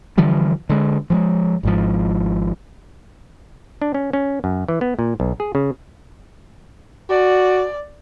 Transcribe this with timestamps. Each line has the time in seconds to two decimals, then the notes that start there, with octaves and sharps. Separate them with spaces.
0.18 D3 E3 F3 G3
0.69 D3 G#3
1.10 F3 G3 G#3
1.63 G#1 G#2 F3
3.82 D4
3.94 C#4
4.13 C#4
4.44 F#2
4.68 E3
4.81 B3
4.99 A#2
5.20 B1
5.40 G#4
5.55 C#3
7.10 F#4 D5